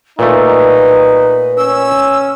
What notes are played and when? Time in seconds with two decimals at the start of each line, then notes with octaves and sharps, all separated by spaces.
0.19 A#2 A3 D#4 B4
1.58 C#4 E6